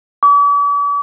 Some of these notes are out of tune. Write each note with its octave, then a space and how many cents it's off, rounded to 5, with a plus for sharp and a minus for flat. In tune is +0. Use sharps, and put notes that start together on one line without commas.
D6 -45